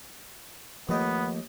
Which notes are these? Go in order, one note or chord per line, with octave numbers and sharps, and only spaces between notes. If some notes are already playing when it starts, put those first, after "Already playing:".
D#2 F3 A3 B3 D#5 G5